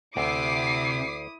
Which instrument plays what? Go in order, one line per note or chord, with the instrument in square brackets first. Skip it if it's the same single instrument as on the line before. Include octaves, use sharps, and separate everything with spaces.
[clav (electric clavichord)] D2 [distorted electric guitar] C3 [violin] E4 D#6 [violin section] D6 C7